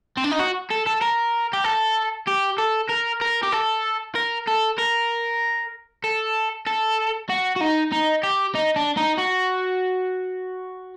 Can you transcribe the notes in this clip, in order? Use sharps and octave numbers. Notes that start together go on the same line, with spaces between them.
C4
D4
D#4
F#4
A4
A4
A#4
G4
A4
G4
A4
A#4
A#4
G4
A4
A#4
A4
A#4
A4
A4
F#4
F#4
D#4
D#4
G4
D#4
D4
D#4
F#4